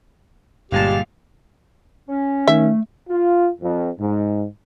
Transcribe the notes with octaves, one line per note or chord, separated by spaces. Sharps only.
G1 A#2 G3 G#3 G4 F5 A5 F6
C#4
D#3 A3 E5
F4
F2
G#2